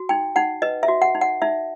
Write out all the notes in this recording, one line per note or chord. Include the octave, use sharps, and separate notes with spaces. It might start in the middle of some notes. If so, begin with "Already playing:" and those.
Already playing: F#4
D#4 G5
D#4 F#5
B4 D#5
E5
F#4
F#5
D#4
F#5
D#4 E5